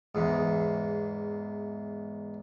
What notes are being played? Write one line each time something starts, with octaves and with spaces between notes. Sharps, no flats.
E2 G#2